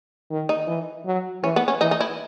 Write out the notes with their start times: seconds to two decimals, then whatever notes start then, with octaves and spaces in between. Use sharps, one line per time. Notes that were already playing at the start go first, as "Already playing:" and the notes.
0.30 D#3
0.49 D#4
0.67 E3
1.06 F#3
1.43 E3 C#4
1.56 B3
1.68 C#4
1.81 E3 D#4
1.91 D#4
2.00 E4